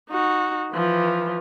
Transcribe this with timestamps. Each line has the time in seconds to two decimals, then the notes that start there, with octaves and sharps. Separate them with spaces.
0.10 D#4 F#4
0.72 E3 F3